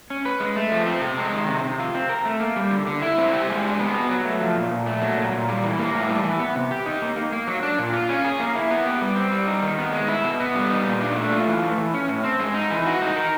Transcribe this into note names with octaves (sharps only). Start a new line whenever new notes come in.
C#4
B4
G#3
A3
F3
C4
C3
G#3
D#3
C3
C3
F4
C4
A#4
A3
A#3
G3
D3
D3
E4
C4
G4
G#3
D4
B3
F#4
F#3
A3
F3
A#2
A#2
A3
F#3
A#2
A#2
G3
E3
A#3
A2
G3
E3
B3
C3
G4
D#4
A#3
A#3
A#3
F#3
D4
A#2
F4
C#4
G#4
A#3
E4
B3
G4
G3
C4
G3
D#4
D#3
B3
G#3
E4
B2
B3
G3
D#4
A#2
D4
A3
F4
E3
A3
E3
C#4
A2
C4
G#3
D#4
E3
F#4
D#4
A#4